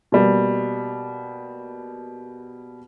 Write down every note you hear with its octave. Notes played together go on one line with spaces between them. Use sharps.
B2 G3 A#3